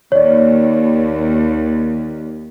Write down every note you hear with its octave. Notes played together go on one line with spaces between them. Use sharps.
D#2 C#5 D5